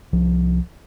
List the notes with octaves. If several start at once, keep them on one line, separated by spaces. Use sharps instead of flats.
C2 F3